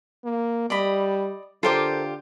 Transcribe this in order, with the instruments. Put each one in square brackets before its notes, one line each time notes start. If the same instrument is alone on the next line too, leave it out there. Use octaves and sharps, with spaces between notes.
[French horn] A#3
[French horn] G3 [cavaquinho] D5 D#5 B5
[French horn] D3 [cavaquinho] F4 G4 D6 [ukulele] A4 A#4 C5